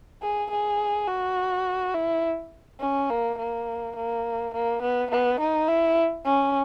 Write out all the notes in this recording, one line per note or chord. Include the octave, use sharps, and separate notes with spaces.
G#4
G#4
F#4
E4
C#4
A#3
A#3
A#3
A#3
B3
B3
D#4
E4
C#4